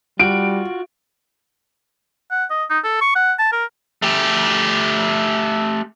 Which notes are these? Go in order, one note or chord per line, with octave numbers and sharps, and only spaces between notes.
G3 F4 F#4 D7
F#5
D#5
D#4
A4
C#6
F#5
A5
A#4
A3 G4